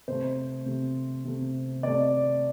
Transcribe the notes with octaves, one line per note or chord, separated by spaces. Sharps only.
C3 A3 C5
C3 A3
C3 A3
C3 A3 D5